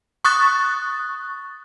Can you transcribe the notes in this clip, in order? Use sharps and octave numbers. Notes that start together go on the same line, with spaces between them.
C#6 D#6 F#6 A6